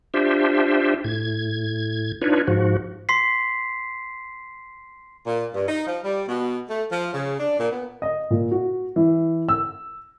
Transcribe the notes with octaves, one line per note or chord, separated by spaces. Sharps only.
D4 F4 G4 C5 E5
A2 G#6
D4 D#4 F4 B4 C#5
G#2 F3 F#4
C6 B6 C7
A#2
G2
D#4
F3
G3
B2
A3
F3
C#3
D4
A#2
B3
D#5
A#2
F#4
E3
E6